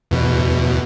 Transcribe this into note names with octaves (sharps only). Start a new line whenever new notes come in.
E2 B2